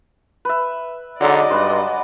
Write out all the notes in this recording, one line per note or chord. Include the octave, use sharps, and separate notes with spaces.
B4 E5
D3 F#3 G#3 D#4 D5 D#5
G2 B4 C5